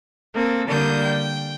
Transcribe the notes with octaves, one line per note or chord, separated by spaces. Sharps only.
A#3 C4 A4
D3 G3 A#3 D#6 G6
G5